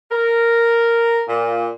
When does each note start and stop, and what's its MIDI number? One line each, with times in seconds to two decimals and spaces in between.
0.11 1.22 70
1.29 1.68 46